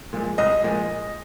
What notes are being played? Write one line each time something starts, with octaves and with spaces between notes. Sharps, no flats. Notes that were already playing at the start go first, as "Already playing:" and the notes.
A#2 F3 G#3
C2 D#5
A#2 F3 G#3